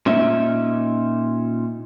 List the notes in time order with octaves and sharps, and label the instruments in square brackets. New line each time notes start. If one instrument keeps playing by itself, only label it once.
[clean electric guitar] A#2 C#4 D#4 E5